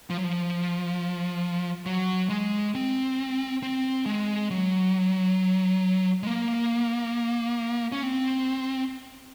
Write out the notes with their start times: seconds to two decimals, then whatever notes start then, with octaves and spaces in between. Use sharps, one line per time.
0.10 F3
0.17 F#3
0.24 F3
1.86 F#3
2.30 G#3
2.75 C4
3.62 C4
4.06 G#3
4.51 F#3
6.23 G#3
6.27 A#3
7.92 C#4
8.03 C4